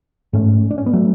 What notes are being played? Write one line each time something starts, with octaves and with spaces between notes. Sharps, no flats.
G#2 A3 C#4
D4
C#4
B3
F#3 A3